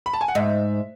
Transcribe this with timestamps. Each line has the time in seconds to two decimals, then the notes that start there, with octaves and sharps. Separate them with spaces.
0.06 B5
0.14 A5
0.21 G#5
0.28 F#5
0.35 G#2 E5